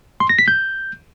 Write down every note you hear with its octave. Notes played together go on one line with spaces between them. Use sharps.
C6
A#6
B6
G6